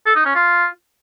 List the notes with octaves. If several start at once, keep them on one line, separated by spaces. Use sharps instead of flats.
A4
D#4
C#4
F4